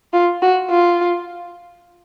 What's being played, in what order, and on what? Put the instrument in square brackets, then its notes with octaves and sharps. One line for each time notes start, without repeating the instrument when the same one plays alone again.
[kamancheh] F4
F#4
F4